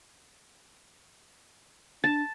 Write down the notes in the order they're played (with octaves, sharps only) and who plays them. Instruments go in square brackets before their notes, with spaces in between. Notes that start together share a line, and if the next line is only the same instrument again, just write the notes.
[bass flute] D4 [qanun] A5